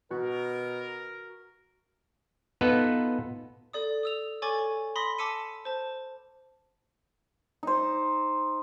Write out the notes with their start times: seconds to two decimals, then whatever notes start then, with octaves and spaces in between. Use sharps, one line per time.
0.11 B2 F#4 A#4
2.61 B3 D#4 F4 A4 B4
3.73 A4 D5 D#6
4.03 D#6 E6 F7
4.42 A4 C#5 G#5 C#6 D6 A6
4.96 B5 C6 D#6 A#6 B6
5.18 A5 D6 E6 B6 C#7 D#7
5.65 C5 A5
7.63 D#4 C5